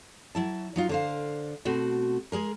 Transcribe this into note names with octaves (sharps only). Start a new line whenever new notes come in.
F#3 E4 A5
F#3 D#4 F4
D3 C5 F5
B2 A3 C4 F#4
G#3 G#4 A#4